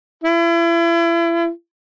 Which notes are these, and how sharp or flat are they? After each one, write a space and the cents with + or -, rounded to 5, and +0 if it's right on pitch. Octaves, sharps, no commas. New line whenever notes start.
E4 +35